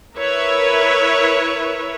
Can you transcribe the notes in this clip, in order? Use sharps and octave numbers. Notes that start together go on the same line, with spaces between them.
E4 A#4 B4 C#5 E5